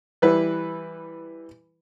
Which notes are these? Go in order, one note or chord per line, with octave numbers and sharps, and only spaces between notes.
E3 G3 E4 B4